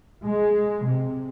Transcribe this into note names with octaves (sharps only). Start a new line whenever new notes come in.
G#3
C3